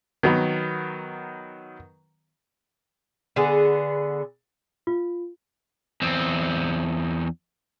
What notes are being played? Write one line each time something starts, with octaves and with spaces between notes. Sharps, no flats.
D#3 F#3 B3
D3 B3 G#4
F4
E2 C4